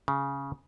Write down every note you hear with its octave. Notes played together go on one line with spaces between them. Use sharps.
C#3